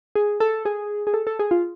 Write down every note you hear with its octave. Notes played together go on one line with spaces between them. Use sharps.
G#4
A4
G#4
G#4
A4
A4
G#4
F4